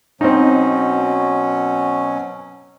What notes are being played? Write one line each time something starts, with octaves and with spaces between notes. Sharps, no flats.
B2 F#3 C4 C#4 D#4